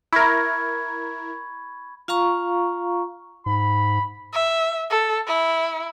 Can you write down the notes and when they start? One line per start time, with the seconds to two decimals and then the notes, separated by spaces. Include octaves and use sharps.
0.13 E4 A#4 B5 C#6 G#6
2.08 F4 F5 A#5 C#6
3.46 G#2 B5
4.33 E5
4.90 A4
5.27 E4